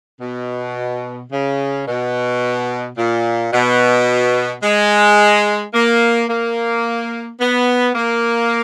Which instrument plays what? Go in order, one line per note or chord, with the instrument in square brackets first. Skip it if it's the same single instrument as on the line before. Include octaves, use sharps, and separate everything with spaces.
[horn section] B2
C#3
B2
A#2
B2
G#3
A#3
A#3
B3
A#3